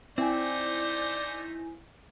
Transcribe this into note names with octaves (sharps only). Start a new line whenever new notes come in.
A3 C4 D#4 E4 C5 D5 G#5